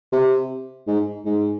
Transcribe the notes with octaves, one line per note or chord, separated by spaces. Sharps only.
C3
G#2
G#2